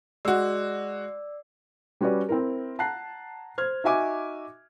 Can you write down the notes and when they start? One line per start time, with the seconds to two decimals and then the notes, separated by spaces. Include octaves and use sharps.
0.25 G#3 F#4 D5 E6
2.01 G3 C#4 F#4 G4 B4 D5
2.29 C4 E4 A#4
2.79 F#5 A5 A#5 F#6 C7
3.58 C5 F6 G#6
3.84 D#4 F#4 E5 G#5 D6